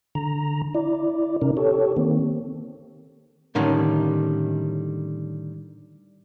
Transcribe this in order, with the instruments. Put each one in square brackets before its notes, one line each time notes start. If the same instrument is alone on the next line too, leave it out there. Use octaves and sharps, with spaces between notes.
[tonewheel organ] D3 A#5
E4 D5
C3 C#4 D#4 A#4
G4 A4 C#5
D#3 A#3 C4
[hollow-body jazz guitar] A2 D3 D#3 G3 C#4